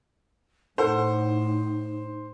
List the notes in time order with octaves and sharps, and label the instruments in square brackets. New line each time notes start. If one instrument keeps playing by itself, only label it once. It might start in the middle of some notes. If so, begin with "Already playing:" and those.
[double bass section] A2 [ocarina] D#4 [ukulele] A4 F#5 [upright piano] C5